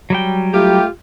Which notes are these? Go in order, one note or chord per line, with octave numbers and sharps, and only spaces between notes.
F#3 G3 G5
A3 F4 G4